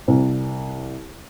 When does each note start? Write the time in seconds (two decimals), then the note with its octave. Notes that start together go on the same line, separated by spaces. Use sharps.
0.08 C2